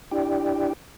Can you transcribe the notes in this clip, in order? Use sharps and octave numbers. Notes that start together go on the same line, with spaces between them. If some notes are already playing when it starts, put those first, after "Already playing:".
D4 E4 G4 D5 G5